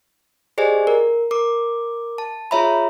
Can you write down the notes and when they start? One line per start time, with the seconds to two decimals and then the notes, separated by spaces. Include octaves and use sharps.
0.58 G4 G#4 C5 D5 D#5 G#5
0.87 A#4
1.31 A#4 D6
2.18 A5
2.51 F4 G#4 C#5 E5 A#5 B5